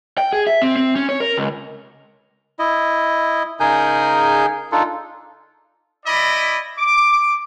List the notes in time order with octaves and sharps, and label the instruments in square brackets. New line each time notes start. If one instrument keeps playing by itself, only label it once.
[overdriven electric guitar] G5
G#4
E5
C4
C4
C#4
C#5
A#4
C#2
[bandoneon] E4 D#5
C#3 D#4 G#4 A#4 G#5 G6
D4 D#4 F4 A4
[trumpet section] E4 D5 D#5 B5
D6